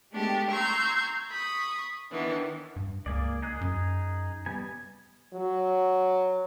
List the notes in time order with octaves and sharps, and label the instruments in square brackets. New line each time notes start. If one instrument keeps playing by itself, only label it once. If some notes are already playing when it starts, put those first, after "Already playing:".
[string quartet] G#3 A3 B3 D4 G4
A#5 C6 C#6 E6 G6 G#6
B5 C#6 D#6
D#3 E3 B3 D4
[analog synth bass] G2
[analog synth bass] C#2 [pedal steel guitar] A#3 G#4 D5
[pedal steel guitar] D#4 G#4 F#6
[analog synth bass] F#2
[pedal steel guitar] G3 B3 G#5
[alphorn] F#3